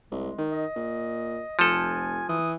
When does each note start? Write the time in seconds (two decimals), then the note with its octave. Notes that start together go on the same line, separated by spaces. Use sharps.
0.11 C2 G#3
0.38 D#3
0.52 D#5
0.76 A#2
1.59 F1 F3 A4 G#5
2.29 E3 D#6